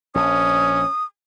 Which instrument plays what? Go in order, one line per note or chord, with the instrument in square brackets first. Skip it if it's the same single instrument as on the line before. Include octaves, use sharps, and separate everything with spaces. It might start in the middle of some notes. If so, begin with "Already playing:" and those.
[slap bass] A#1 [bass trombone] C#4 [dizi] D#6